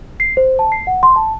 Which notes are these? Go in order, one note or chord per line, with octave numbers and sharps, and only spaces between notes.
C7
C5
A5
C7
F#5
C6
A5